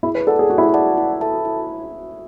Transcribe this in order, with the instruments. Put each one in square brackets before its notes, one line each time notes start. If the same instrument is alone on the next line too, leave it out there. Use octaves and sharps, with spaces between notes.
[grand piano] E4 [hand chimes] G#4
[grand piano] B4
[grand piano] A4 [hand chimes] D5 F#5 A5
[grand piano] G#4
[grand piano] F#4 [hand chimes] G#4
[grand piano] E4
F#4
[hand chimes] D5 F#5 A5
E4
A4 E5 A5
E4